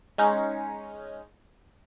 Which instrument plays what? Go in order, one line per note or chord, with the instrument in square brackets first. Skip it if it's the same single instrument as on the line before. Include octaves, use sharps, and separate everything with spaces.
[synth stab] G#3 C#4 D#4